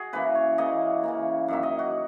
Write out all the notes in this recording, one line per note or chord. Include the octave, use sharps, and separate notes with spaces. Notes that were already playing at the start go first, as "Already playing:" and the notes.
Already playing: F#4 G#4
C#3 E3 A#3 B4
C#5
C#3 E3 A#3 D#5
C#3 E3 A#3
F#2 D#3 A#3 E5
D#5
F#4